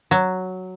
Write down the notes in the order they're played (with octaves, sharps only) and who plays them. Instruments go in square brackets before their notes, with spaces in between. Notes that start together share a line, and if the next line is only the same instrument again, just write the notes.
[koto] F#3